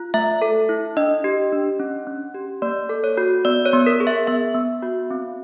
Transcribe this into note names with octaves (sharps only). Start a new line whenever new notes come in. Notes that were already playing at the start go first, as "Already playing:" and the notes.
Already playing: F4
A3 E5
A4
E4
D4 D#5
G4
D4
C#4
C#4
G4
A#3 D5
A4
C#5
F#4
B3 D5
C#5
B3
A#4
G#4
E5
B3 E5
B3
F#4
C4